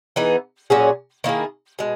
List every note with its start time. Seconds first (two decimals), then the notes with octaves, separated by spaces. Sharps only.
0.16 E3 B3 D#4 G#4
0.70 A#2 F#3 C#4 G#4
1.24 D#3 A#3 E4 G#4
1.79 B2 G#3